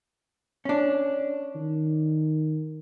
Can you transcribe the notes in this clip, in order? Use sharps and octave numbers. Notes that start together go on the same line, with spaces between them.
C#4 D4
D#3